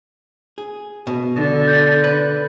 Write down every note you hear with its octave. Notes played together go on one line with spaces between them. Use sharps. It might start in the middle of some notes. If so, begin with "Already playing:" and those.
G#4
B2
D3
G6 A6
B4